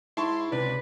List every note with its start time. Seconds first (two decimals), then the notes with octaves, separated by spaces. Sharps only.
0.17 G#2 E4 A5 C6 C#6
0.52 C#2 C3 B4 D5